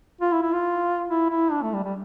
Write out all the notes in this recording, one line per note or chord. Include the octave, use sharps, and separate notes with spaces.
F4
E4
E4
F4
E4
E4
D4
A3
G3
G3